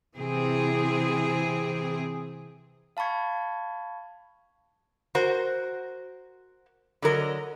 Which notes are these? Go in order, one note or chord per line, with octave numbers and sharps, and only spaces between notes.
C3 E3 C4 G#4
F5 A5 B5 C#6 G#6
F#4 A#4 C5
D3 F#3 A#4 D#5